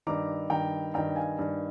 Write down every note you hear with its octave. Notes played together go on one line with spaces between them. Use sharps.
G2 D#3 A#5 D6
G2 D#3 G5 A#5
G2 D#3 G5 A#5
F5 G#5
G2 D#3